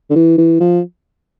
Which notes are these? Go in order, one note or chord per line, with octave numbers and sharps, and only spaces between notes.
D3
E3
E3
F3